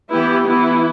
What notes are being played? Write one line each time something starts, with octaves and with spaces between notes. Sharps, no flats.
E3 B3 E4 G4
E3 B3 E4